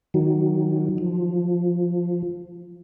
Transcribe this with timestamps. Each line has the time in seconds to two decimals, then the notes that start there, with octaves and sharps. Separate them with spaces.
0.14 D#3 F#3
0.98 F3